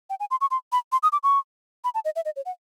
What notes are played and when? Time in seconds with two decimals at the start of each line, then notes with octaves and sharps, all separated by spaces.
0.10 G5
0.20 G#5
0.31 C6
0.41 C#6
0.51 C6
0.72 B5
0.92 C6
1.03 D#6
1.12 D6
1.23 C#6
1.84 B5
1.94 A5
2.05 D#5
2.16 E5
2.25 D#5
2.36 C#5
2.46 F#5